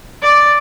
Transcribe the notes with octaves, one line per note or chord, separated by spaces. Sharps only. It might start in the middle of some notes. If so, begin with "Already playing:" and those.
D5